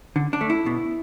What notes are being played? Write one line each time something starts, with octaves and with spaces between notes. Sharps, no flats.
D3
D4
A3
E4
B2